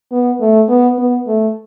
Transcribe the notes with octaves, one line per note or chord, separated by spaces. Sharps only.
B3
A3
B3
B3
A3